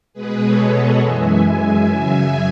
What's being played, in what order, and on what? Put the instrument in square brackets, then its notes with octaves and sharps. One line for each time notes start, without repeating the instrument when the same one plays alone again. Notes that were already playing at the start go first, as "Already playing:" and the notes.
[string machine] B2 G#3 G#4 B4
A4 C#5
D#5 F#5
F#2 E3 G#3 E5 G#5
E5 G#5
F#2 C#3 F#3 E5 G#5